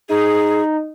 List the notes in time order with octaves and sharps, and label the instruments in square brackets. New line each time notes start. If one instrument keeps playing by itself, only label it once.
[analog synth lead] D#4 [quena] G#4